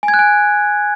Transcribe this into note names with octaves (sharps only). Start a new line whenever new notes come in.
G#5
G#6
F#6
G#5